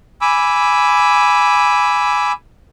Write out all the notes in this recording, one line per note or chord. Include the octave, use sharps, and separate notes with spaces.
G#5 B5 D6 E6